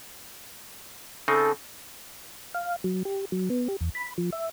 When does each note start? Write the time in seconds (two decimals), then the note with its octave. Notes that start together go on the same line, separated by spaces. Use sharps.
1.28 C#3 C4 D#4 A4
2.54 F5
2.84 F#3
3.05 G4
3.32 F#3
3.50 B3
3.68 G4
3.81 E2
3.95 B5
4.18 F3
4.32 E5